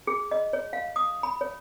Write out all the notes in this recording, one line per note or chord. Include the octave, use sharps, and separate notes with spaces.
G#4
D#5
C#5
F5
D#6
B5
C#5